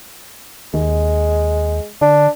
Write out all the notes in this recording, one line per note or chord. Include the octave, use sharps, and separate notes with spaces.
D#2 G#3
D3 D4